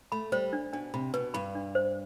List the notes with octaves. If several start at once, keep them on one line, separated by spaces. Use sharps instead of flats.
A3 B5
G3 C5
D4
B2 D4
C3 B5
B2 B4
G2 B5
D4
C5